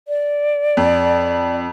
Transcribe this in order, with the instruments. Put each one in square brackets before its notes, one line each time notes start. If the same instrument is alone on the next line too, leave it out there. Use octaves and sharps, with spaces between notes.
[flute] D5
[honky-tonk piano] F2